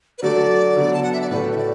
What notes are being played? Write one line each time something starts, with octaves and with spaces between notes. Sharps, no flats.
B4
D3 F#3 A3 F#4 A4 D5
D3 F#3 B3
A5
F#5
E5
D5
A2 A3 D4 F#4 A4 B4
E5
D5